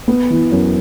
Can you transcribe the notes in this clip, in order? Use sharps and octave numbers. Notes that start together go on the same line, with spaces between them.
B3
E3
F#2